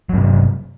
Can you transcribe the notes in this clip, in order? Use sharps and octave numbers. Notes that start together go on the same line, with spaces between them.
G2 C3 F#3